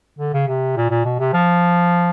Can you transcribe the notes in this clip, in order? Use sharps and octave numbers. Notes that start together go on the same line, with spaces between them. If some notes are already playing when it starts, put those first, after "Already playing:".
D3
C#3
C3
A#2
A#2
B2
C3
F3